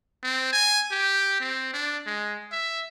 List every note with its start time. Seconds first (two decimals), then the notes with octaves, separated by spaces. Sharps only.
0.23 C4
0.53 G#5
0.91 G4
1.40 C4
1.74 D4
2.07 G#3
2.52 E5